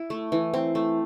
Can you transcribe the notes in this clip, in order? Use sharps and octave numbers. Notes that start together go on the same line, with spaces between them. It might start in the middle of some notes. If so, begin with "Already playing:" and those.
Already playing: E4
A3
E3
C4
A3